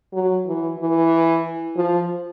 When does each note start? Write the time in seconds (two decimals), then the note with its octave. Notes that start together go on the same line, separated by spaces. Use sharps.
0.13 F#3
0.47 E3
0.79 E3
1.76 F3